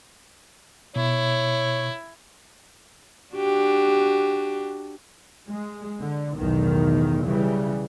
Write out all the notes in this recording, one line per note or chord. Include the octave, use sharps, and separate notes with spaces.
B2 E4 C#5
D4 F#4 G4
G#3
D3
B1 E2 A2 D#3
C#3 E3 G3